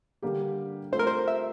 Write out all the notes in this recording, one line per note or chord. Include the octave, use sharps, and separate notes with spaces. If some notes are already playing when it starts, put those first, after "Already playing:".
D3 G3 A#3 D4 G4
A3 C4 F4 A4 C5
A#4
C5
E5